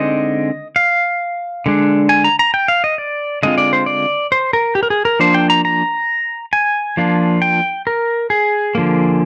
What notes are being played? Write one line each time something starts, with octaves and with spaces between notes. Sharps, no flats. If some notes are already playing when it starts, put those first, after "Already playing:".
Already playing: D3 G#3 C4 D#4 D#5
F5
D3 G#3 D4
G#5
A#5
A#5
G5
F5
D#5
D5
D3 G#3 C4 F4 D#5
D5
C5
D5
C5
A#4
G4
A#4
G#4
A#4
F3 A#3 D4 C5
G5
A#5
A#5
G#5
F3 A#3 D4 F4
G5
A#4
G#4
D3 F3 A#3